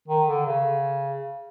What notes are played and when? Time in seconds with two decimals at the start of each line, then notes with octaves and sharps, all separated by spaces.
0.08 D#3
0.27 D3
0.46 C#3